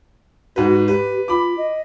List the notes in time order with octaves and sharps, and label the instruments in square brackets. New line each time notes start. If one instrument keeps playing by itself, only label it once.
[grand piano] G#2 B4 [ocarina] F#4
[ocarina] G4 [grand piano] B4
[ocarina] F4 [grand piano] B5 D6
[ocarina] D#5